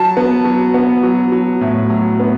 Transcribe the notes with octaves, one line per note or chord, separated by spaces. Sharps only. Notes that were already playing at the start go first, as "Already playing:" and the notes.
Already playing: F#3 A5
B3
F#3
B3
F#3
F#3
A2
F#3
B3